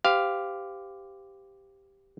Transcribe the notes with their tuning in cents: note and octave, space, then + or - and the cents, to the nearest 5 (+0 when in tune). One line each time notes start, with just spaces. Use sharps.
G4 +0 C5 -35 F5 +0